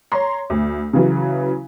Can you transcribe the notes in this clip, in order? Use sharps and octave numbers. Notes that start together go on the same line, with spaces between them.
C#5 A#5 C6
D2
C#3 E3 F#3